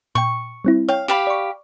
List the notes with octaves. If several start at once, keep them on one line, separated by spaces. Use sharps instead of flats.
A#2 G5 C#6
G3 C4 E4
C#5 F5 G5
G4 F5 B5 E7
D5 C#6